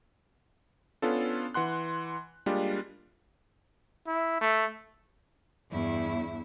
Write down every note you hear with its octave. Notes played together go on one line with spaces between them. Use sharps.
B3 C#4 D4 F4 A4
E3 F#5 C6 F#6
G3 G#3 A#3 D4 F4 G4
E4
A3
E2 G2 E4